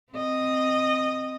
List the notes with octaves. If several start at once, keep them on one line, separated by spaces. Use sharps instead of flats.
C4 D#5